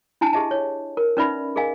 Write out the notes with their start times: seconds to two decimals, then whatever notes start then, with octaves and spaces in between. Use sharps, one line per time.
0.21 D4 E4 G#5 A5
0.33 G4 G#4 D#5 E5 A5
0.51 C#5
0.97 A#4
1.17 C#4 D#4 B4 D5 E5 B5
1.56 G#4 A#4 D#5 F5 G#5